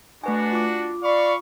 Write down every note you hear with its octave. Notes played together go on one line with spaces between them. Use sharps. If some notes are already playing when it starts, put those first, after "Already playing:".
A3 D4 F#4 B4 G#5
F4 D6
D5 F5 B5 C#6